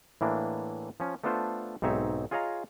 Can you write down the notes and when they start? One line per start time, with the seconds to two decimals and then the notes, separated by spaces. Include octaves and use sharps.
0.21 A2 E3 A#3 D4
1.00 F3 C#4
1.24 A3 B3 D4 F4 A4 C5
1.82 B1 G#2 C4 D#4 C#5 E5
2.31 F4 G#4 C#5 D#5 F5 A#5